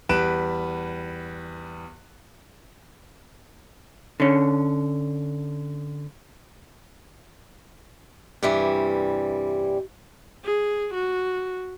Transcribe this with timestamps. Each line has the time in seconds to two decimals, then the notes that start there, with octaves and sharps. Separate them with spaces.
0.09 E2 G3 B4 F#6 D7 E7
4.20 D3 C#4
8.43 G2 C3 E3 G3
10.44 G#4
10.94 F#4